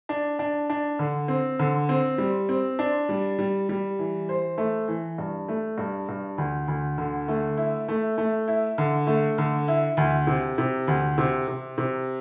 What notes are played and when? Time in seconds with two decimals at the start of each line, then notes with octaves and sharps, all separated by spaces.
0.09 D4
0.39 D4
0.70 D4
0.99 D3
1.28 C4
1.59 D3
1.89 C4
2.18 G3
2.49 C4
2.79 D4
3.09 G3
3.39 G3
3.69 G3
3.99 E3
4.29 C5
4.58 A3
4.88 E3
5.18 G2
5.48 A3
5.78 G2
6.09 G2
6.38 D2
6.68 D2
6.98 D3
7.28 A3
7.57 E4
7.88 A3
8.18 A3
8.48 E4
8.78 D3
9.07 A3
9.38 D3
9.68 E4
9.97 D2
10.27 C3
10.58 C3
10.88 D2
11.18 C3
11.47 C3
11.78 C3